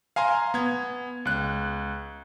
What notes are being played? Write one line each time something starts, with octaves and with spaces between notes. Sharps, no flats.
F5 G#5 A#5 C6
B3 G#6
C#2 F#6